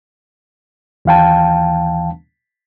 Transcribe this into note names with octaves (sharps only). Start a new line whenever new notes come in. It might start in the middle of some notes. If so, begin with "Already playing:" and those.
D#2 E3 F5 G5 A5